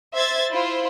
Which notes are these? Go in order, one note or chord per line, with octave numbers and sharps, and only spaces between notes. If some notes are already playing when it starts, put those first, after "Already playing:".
C5 E5 G#6 A6
E4 F4 C5